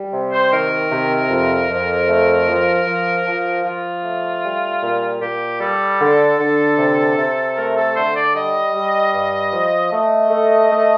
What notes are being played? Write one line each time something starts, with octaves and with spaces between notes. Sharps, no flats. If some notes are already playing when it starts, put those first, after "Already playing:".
Already playing: G3
C3
C5
D#3 A#4
C3
F2
F2
A3
F3
F3
F3
F3 F4
A3
G3
A#2
A#2 G4
G3 A4
D3
D3
C3
C3
A3 A#4
A4
D3 C5
D5
G3 D#5
G3
G2
F3
A3 D#5
A3
A3